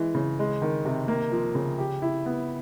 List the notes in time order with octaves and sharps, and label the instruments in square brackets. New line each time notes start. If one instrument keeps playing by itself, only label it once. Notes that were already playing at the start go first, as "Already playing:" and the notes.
Already playing: [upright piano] E3 G#3
C#3
G#3
D#3
C3
A#3
F3
C#3
G4
E4
B3